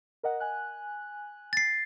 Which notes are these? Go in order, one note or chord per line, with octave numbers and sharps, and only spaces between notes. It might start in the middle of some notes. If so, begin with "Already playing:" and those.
A#4 D#5 F#5
G#5 F#6
A6 C7